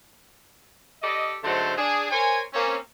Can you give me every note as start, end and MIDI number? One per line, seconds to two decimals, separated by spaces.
1.02 1.36 67
1.02 1.36 69
1.02 1.36 74
1.02 1.36 75
1.44 1.73 44
1.44 1.73 50
1.44 1.73 54
1.44 1.73 57
1.44 1.73 72
1.44 1.73 81
1.78 2.07 62
1.78 2.07 68
2.11 2.40 70
2.11 2.40 72
2.11 2.40 73
2.11 2.40 80
2.53 2.76 58
2.53 2.76 60
2.53 2.76 61